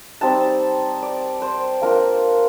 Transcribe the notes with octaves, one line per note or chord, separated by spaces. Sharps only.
G3 C4 D#4 A5
D5
C5
A#3 D4 F4 A#4